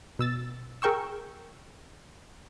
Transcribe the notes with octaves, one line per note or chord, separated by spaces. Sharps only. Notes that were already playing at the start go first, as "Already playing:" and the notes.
B2 E6 A6
G#4 A#4 G5 C#6 E6